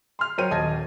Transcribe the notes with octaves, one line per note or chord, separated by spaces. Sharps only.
C6 F6
F#3 A#4 C5 C#5 G5 D#7
D#1 D#5 A5 G#6